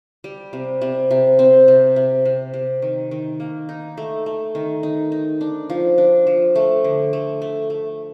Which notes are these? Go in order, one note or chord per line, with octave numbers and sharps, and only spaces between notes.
G3
C3
C3
C3
C4
C3
C3
C3
C3
D#3
D#3
A#3
D#4
A3
A3
D#3
D#4
D#4
D4
F3
D4
F3
A3
D3
A3
A3
A3